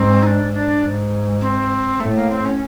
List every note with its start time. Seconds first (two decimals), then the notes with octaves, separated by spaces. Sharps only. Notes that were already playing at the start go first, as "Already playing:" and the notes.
Already playing: G#2 C4
0.23 D#4
0.27 D4
0.53 D4
0.82 G#2
1.41 C4
2.00 A2 A3
2.15 A#3
2.30 C4
2.45 C#4